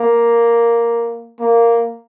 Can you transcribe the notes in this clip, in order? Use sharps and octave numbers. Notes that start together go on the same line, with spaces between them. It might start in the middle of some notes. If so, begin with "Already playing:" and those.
Already playing: A#3
A#3